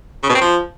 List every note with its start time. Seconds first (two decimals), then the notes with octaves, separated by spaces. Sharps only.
0.23 C#3
0.29 B2
0.35 C4
0.41 F3